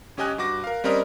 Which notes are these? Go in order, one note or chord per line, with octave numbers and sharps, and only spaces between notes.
G1 C#4 G4 D#5 G#5 F#6
G2 F#4 D6 A#6
A#4 F5
G3 C4 C#4 A#4 D5 D#5